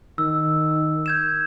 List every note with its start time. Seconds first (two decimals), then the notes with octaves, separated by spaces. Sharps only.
0.18 D#3 E6
1.06 G6 G#6 E7